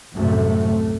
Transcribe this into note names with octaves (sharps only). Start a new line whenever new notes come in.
C2 F#2 A2 C3 A3